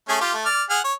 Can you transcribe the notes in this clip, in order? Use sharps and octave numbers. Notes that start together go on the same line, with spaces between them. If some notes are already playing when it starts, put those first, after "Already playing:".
A3 C#4 G#4
F4 G4
A3
D5 F6
G#4 F#5 F6
C#5